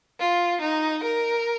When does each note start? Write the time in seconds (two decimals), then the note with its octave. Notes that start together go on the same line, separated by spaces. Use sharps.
0.20 F4
0.61 D#4
1.03 A#4